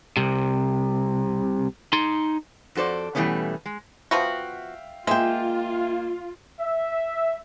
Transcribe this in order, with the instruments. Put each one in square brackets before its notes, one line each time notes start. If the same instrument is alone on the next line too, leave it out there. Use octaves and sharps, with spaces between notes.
[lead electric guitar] C2 C3
D#4 C6
[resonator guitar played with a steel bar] F2 F#4 A4 C5 D5
B2 E3 G3 A3 B3 C#4
G#3
[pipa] F3 B3 F#4 [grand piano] E5 F5 G5
[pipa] G#3 [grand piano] A#3 [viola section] F4 [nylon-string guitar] E5 G5
[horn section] E5